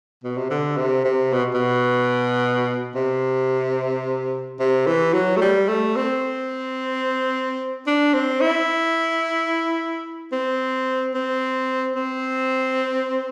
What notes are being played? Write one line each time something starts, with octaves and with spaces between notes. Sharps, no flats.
B2
C3
D3
C3
C3
B2
B2
C3
C3
E3
F#3
A3
G3
A3
C4
D4
C4
E4
C4
C4
C4